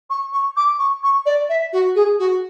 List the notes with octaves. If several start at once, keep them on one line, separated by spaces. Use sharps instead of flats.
C#6
C#6
D6
C#6
C#6
D5
E5
F#4
G#4
F#4